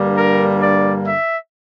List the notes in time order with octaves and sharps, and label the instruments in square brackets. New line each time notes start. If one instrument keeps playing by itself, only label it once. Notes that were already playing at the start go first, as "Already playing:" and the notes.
Already playing: [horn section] G2 D3 G3 A#3
A#4
D5
E5